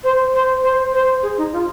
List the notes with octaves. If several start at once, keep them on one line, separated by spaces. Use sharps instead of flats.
C5
C5
C5
C5
G#4
D#4
F4